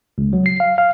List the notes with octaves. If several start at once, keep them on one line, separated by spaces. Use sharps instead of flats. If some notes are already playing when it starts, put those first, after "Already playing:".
C#2
F#3
C7
F5
F5